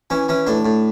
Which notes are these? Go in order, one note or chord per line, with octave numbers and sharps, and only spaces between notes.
E3 C#4
E3 C#4
A2 D4
A2